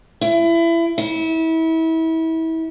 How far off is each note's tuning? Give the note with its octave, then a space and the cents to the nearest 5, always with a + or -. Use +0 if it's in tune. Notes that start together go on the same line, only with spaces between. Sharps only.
E4 +25
E4 -30